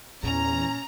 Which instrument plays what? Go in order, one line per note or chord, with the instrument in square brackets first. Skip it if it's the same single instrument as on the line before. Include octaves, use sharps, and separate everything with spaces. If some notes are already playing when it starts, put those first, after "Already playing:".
[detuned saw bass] E2 [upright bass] A#2 [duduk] C#4 [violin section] A#5